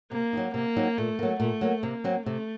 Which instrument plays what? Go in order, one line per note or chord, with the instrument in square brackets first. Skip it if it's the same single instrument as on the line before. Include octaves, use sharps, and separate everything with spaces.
[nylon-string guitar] C3 [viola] A#3
[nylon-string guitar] F#3 C4 D#4
[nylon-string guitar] C3 [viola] A#3
[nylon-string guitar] F#3 C4 D#4
[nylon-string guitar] A#2 [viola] A3
[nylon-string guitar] F#3 A#3
[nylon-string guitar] A#2 [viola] A3
[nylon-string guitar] F#3 A#3
[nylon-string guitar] C3 [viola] A#3
[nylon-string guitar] F#3 C4
[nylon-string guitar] C3 [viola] A3